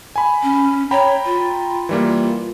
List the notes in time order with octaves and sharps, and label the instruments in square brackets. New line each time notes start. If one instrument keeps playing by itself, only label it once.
[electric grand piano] G#5 B5
[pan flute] C#4
[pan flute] C#5 [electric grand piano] G5 A#5 B5
[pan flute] F4
[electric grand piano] E3 G3 A#3